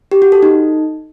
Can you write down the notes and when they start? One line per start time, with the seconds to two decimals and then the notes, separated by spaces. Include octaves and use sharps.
0.12 G4
0.22 F#4
0.32 A4
0.42 D#4